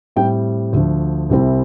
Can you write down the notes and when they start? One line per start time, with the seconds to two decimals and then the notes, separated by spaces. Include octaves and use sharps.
0.16 A2 G3 C4 G5
0.73 D2 D3 F3
1.30 C2 C3 G3 C4 E4